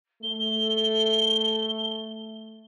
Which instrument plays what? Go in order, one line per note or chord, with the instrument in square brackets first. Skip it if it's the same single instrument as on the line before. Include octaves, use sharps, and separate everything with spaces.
[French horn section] A3 [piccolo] G7